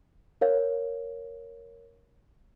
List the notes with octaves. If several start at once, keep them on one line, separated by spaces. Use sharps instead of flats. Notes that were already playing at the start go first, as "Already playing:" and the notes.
A#4 C#5 F5